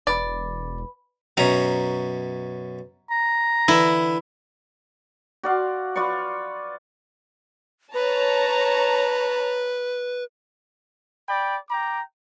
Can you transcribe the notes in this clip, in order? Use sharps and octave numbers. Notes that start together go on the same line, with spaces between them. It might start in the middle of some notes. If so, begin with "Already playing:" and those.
E1 B4 D5 B5
F#2 B2 C#4 A#5
A#5
D3 E3 E4
F#4 D5 F5 C6
F4 B4 D5 C#6
B4 C#5 A5 A#5
D5 G5 B5
G5 A#5 D6